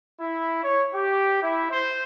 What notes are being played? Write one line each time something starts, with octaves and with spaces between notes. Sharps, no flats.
E4
C#5
G4
E4
C5